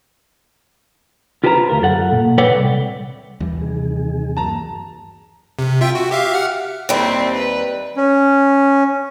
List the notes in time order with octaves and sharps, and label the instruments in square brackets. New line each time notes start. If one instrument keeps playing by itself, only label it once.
[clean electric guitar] F4 G4 B4 C5 A5 A#5
D2 F4 A#4
F#2 A4 F#5
A#2
A4 B4 C#5 D5 F#5 G5
C2
[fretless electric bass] D#2 E3 G3
[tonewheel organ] C3 D#3 G#4
[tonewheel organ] G2 F#3 A#3 [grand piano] A5 A#5
[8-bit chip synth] C3
F4 E5 G5
F#4
G4 E5 F5
F#5 F6
[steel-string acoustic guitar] D#2 G3 [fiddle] C4 E4
[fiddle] B4
[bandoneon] C#4